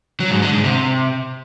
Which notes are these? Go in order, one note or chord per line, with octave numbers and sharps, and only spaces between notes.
F#3
G#2
D3
G#2
C3